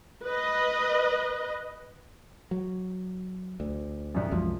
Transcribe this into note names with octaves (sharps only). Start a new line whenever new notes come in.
B4 D#5
F#3
D2
C2 F#2
C2 F#2 F3 G#3